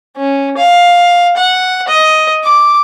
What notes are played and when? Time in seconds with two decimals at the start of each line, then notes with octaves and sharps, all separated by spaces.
0.17 C#4
0.57 F5
1.37 F#5
1.88 D#5
2.44 D6